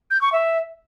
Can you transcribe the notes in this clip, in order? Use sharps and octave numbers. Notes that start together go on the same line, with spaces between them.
G6
C#6
E5